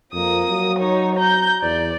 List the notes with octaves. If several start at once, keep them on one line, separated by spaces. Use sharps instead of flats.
F2 A#3 D#6
F#3
D#4 C#5
A#5 G6
E2 D5